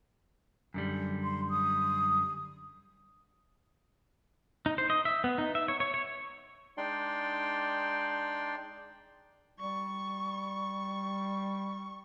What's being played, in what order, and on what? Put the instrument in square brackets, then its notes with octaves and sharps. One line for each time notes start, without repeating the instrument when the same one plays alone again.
[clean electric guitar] F#2 D3 G3
[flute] C6
D#6
[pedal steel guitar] D#4
C5
D#5
E5
B3
D#4
E5
C#5
C#5
C#5
[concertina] G#3 D4 D#4 D5 G5 C6
[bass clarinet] G3 [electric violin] C#6